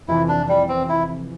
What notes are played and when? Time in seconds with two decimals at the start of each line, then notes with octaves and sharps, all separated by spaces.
0.08 F2 C3 E3 E4
0.28 D4
0.49 G3
0.69 C4
0.89 E4